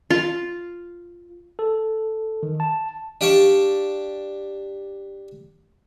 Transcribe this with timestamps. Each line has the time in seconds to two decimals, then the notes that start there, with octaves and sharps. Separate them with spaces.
0.10 F4
1.59 A4
2.43 D#3
2.60 A5
3.21 D4 G4 D5 F5 A5 C#6